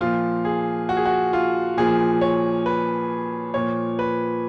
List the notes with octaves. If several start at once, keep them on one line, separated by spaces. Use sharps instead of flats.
A#2 F3 F4
G#4
F#4
G#4
F#4
F4
A#2 F3 G#4
C#5
B4
A#2 F3 C#5
B4